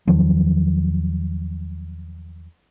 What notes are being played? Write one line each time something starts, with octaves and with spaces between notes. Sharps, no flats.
E2 D#3 F3 F#3